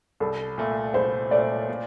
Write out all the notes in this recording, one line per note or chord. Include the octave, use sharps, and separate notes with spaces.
C2 A4
A#2 A3
C2 C5
A#2 A3 D5
A#2